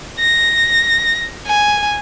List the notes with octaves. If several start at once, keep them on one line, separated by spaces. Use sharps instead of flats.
A#6
G#5